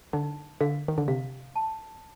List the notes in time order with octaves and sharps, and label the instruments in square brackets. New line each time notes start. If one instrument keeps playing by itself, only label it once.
[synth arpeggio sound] D3 [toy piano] D#4
[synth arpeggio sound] D3 [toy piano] F5
[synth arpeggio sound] D#3
D3
[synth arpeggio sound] C3 [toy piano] F5
[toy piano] A5